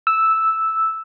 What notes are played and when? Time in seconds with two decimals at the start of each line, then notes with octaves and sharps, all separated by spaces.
0.07 E6